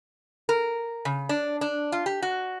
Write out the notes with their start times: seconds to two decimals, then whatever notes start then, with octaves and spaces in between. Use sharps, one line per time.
0.49 A#4
1.05 C#3
1.29 D4
1.61 D4
1.92 F4
2.06 G4
2.22 F#4